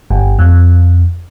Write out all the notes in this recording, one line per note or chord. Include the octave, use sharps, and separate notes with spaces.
G1
F2